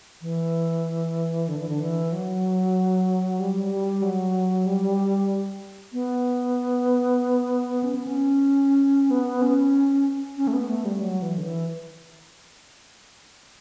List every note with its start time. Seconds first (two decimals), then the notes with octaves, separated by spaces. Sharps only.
0.22 E3
1.48 D3
1.59 E3
1.69 D3
1.80 E3
2.12 F#3
3.40 G3
3.71 G3
4.02 F#3
4.66 G3
5.93 B3
7.83 C#4
7.95 B3
8.07 C#4
9.10 B3
9.42 C#4
10.37 C#4
10.48 A3
10.53 B3
10.69 A3
10.85 G3
11.01 F#3
11.22 E3
11.38 D3
11.43 E3